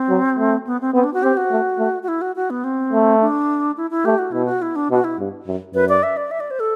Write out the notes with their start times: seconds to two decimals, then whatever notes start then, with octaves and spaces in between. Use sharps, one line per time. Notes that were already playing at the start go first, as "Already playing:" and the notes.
Already playing: C4
0.09 F#3
0.38 A3
0.67 B3
0.81 C4
0.94 B3 C4
1.04 D4
1.14 F#4
1.23 C4 G4
1.37 F#4
1.51 A3
1.79 A3
2.03 F#4
2.08 E4
2.22 F#4
2.36 F#4
2.50 B3
2.64 C4
2.93 A3
3.21 D4
3.77 E4
3.91 E4
4.05 A3 G4
4.19 F#4
4.32 B2 E4
4.45 F#4
4.62 E4
4.76 D4
4.91 B2 F#4
5.04 E4
5.19 G2
5.47 F#2
5.74 F#2 B4
5.89 D5
6.03 E5
6.17 D5
6.31 E5
6.40 D5
6.51 C5
6.60 A4